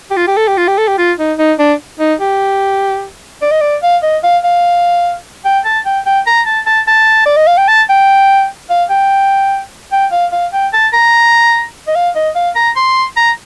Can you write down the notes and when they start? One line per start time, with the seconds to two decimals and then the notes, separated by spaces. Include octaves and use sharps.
0.11 G4
0.17 F4
0.28 G4
0.37 A4
0.48 G4
0.57 F4
0.68 G4
0.78 A4
0.88 G4
0.98 F4
1.19 D#4
1.39 D#4
1.59 D4
2.00 D#4
2.21 G4
3.42 D5
3.51 D#5
3.61 D5
3.83 F5
4.03 D#5
4.23 F5
4.44 F5
5.45 G5
5.65 A5
5.86 G5
6.06 G5
6.27 A#5
6.46 A5
6.66 A5
6.88 A5
7.26 D5
7.36 D#5
7.47 F5
7.57 G5
7.68 A5
7.89 G5
8.70 F5
8.90 G5
9.92 G5
10.12 F5
10.32 F5
10.53 G5
10.73 A5
10.93 A#5
11.88 D#5
11.96 F5
12.15 D#5
12.35 F5
12.56 A#5
12.76 C6
13.17 A#5